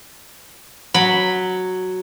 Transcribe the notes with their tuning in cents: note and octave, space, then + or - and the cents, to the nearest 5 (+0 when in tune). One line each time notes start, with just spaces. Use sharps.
F#3 +0 B5 +0